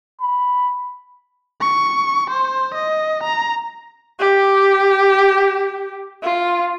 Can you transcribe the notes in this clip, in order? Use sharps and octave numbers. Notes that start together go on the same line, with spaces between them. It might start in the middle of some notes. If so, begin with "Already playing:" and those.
B5
C#6
C5
D#5
A#5
G4
F4